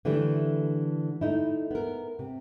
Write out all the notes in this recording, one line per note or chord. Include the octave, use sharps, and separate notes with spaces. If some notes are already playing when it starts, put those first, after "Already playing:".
D3 E3 G3 A3 D4
A3 D#4 E4
B3 A#4
C3